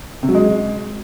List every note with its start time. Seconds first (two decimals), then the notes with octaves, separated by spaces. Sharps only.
0.23 C3
0.29 F#3
0.35 G#3